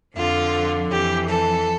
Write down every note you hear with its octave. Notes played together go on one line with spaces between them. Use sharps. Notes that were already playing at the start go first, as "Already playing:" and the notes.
F2 D3 F3 F4
F2 E3 G4
A4